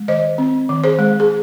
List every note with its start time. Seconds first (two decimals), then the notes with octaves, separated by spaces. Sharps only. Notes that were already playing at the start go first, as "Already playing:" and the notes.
Already playing: G#3
0.08 D#3 C5 D#5
0.38 C4
0.69 D#3
0.84 G#4 C5
0.99 G#3
1.20 G#4